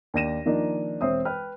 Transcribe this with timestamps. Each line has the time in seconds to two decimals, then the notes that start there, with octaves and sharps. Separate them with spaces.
0.14 D#2 D4 G5 A#6 D#7 E7
0.46 D#3 F3 A#3 D4 D#4
1.01 E1 C4 C5 C#5 E5 D#6
1.25 B4 G5 F6